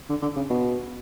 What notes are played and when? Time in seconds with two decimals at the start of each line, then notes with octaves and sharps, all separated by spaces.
0.09 D3
0.22 D3
0.36 C#3
0.50 B2